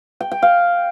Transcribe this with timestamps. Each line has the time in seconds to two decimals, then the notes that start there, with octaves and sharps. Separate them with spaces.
0.20 G5
0.31 G5
0.42 F5